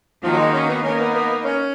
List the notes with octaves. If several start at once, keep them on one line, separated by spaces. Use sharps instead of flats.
D#3 F3 A#3 D#4 F#4
F#3
G#3
C#4
B3
A#3 C#4 D#4 A#4
B3
B3
C#4